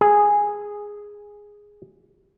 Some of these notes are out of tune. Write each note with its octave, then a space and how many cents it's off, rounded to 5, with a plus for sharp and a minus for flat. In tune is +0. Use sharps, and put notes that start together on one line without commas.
G#4 -5